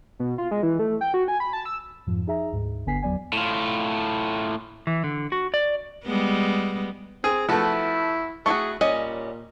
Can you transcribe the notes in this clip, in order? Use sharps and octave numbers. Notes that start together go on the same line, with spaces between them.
B2
F4
G#3
E3
A3
G5
F#4
G#5
B5
A5
E6
F2 G#2 F3
D#4 G#4 E5 A#5
D2 G#2
G1 D3 B3 G#5 B6 C7
E2 F#3 B3 D5 G#5
A2 F4
E3
D3
F#4
D5
G3 G#3 B3
C4 G#4
F3 A3 B3 E4 F#4
A3 E4 F#4 G#4 C#6
A#2 G3 C#4 D#5